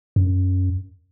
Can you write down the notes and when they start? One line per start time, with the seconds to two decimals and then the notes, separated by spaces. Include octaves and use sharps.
0.16 F#2